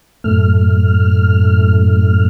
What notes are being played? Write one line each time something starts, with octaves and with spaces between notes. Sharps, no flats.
F#2 A2 A3 F6